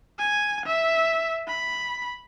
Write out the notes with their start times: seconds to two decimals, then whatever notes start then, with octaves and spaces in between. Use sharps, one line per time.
0.19 G#5
0.66 E5
1.48 B5